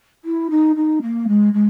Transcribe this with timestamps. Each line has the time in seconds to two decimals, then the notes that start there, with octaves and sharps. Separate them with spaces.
0.24 E4
0.50 D#4
0.76 D#4
1.02 A#3
1.28 G#3
1.53 G#3